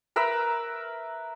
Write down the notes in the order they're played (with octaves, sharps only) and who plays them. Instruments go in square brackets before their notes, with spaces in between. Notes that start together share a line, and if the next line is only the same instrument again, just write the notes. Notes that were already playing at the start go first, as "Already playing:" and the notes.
[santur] A#4 B4 E5